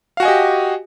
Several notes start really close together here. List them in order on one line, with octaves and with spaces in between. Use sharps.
F5 F#4 G#5 D#5 G4